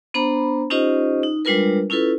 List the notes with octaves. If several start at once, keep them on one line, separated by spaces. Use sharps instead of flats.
B3 D4 C5 A#5 B5
C#4 D#4 F4 G4 C5 D#5
D#4
G3 G#3 D4 F4 A#4 B4
C#4 E4 F4 A4 B4